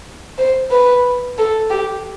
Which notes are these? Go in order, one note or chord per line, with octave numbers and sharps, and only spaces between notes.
C5
B4
A4
G4